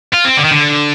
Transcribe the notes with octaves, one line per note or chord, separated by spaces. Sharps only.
F4
C4
D3
D#3
D3